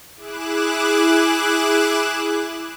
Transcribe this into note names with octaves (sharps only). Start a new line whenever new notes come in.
E4 G#4 D6 F#6 E7